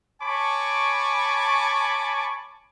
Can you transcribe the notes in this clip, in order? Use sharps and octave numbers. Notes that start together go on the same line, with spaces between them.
C#5 G#5 A5 B5 C#6 D6